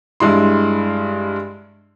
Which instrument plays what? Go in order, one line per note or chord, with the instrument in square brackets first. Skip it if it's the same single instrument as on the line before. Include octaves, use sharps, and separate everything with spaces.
[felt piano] G2 G#3 E4 C6